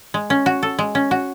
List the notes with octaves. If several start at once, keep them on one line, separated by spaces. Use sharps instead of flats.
G#3
C#4
F#4
A4
G#3
C#4
F#4